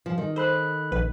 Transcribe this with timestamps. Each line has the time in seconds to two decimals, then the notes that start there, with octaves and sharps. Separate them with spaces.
0.06 F3
0.18 D#3
0.36 A4 C5 B5 F#6
0.92 A#1 B4